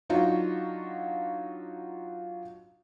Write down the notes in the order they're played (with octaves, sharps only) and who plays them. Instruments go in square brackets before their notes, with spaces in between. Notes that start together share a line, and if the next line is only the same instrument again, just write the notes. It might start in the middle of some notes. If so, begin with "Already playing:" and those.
[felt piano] F#3 D4 D#4 F4 F#4